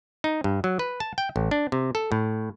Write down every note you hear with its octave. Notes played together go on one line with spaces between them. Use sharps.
D#4
G2
F#3
B4
A5
G5
A1
D4
C3
A4
A2